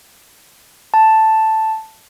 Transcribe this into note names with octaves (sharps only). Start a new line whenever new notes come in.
A5